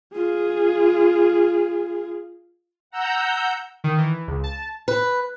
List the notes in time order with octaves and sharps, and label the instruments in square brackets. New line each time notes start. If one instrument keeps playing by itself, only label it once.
[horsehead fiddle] F4 G#4
[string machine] F#5 A#5 E6 G6
[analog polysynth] D#3
E3
C#2
A5
[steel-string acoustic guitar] B4